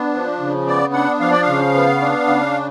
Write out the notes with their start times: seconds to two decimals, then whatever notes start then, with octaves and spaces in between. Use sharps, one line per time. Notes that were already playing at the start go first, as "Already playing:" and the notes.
Already playing: B3 D4
0.14 F3
0.40 C#3
0.67 B3 D5
0.93 D4 F#5
1.20 F3 F5
1.31 D5
1.42 F5
1.47 C#3
1.74 B3
2.01 D4
2.27 C#3